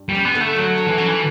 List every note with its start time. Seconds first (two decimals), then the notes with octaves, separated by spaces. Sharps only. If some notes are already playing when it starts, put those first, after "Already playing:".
Already playing: G2
0.09 G3
0.15 C#4
0.25 B3
0.35 D3
0.41 A3
0.56 D3 F#3
0.78 D3
0.88 E3
0.98 F#3 C#4
1.08 E3